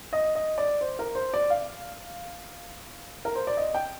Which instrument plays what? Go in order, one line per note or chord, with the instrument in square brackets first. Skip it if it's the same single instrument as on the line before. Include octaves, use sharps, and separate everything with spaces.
[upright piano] D#5
D#5
D5
C5
A#4
C5
D5
F5
A#4
C5
D5
D#5
G5